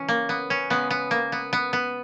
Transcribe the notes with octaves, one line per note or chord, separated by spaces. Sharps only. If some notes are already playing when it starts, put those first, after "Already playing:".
Already playing: C#3 E3 G#3 C#4
A#3
B3
C#4
C#3 G#3 B3
B3
A#3
B3
B3
B3